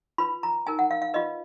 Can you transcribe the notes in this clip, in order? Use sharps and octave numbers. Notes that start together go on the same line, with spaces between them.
F4 B4 B5
A#5
D#4 A#4 G#5
F#5
F5
F5
F4 B4 D#5